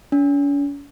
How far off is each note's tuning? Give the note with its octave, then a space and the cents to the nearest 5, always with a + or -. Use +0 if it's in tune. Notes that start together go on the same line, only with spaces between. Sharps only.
C#4 +45